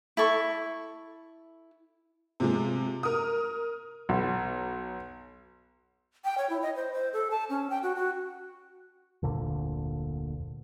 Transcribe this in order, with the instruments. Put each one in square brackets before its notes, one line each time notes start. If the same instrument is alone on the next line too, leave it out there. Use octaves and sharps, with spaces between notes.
[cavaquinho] E4 A4 C#6
[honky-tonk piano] C3 F3 G#3
A#4 D#6
[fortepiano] B1
[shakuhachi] G5
C#5
E4
D#5
C5
C5
A4
A5
C#4
G5
F#4
F#4
[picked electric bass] F1 D2 A#2 D3